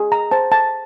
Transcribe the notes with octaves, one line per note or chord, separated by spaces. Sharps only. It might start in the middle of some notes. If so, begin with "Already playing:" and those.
Already playing: G#4
A#5
C5 A5
A5